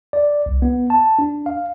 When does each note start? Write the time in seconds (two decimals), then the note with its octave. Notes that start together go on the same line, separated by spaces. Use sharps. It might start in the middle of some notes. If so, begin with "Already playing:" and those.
0.13 D5
0.46 C2
0.62 B3
0.90 A5
1.19 D4
1.46 F5